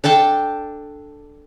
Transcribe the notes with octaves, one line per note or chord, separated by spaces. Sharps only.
D4 A4 G5 A5